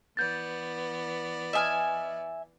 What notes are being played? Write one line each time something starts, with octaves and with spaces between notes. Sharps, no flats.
E3 B3 D5 G6 A6
D#5 E5 G#5 D#6 F6